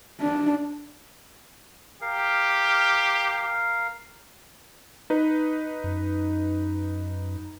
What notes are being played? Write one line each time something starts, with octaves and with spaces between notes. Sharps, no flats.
D4
G4 A#4 F5
D#4 B4
F#2